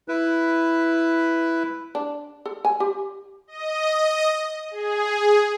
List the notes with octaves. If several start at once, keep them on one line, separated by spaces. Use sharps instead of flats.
E4 B4
D4
A4
G#5
G4
D#5
G#4